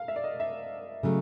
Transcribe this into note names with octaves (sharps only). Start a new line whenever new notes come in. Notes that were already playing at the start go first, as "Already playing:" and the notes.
Already playing: F5
E5
D5
D#5
E5
C#3 F#3 A3